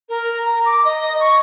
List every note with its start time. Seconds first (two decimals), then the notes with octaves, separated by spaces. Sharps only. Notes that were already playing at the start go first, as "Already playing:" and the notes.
0.09 A#4
0.45 A#5
0.65 D6
0.85 D#5
1.20 C#6